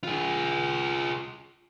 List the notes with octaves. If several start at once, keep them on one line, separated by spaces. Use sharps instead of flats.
F4 G#4